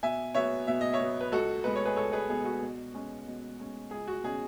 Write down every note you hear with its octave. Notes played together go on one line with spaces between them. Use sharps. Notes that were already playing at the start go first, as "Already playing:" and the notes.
B2 E5 G#5
F#3 B3 C#5 E5
B2 E5
D#5
C#5 E5
F#3 B3
B4
C#2 F#4 A4
B2 G#3 B3 B4
C#5
G#4 B4
C#2 A4 C#5
G#4 B4
B2 G#3 B3 G#4
F#4
B2
G#3 C#4
B2
G#3 C#4
C#2 G#4
F#4
B2 F#3 C#4 G#4